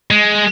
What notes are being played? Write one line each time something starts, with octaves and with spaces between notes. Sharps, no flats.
G#3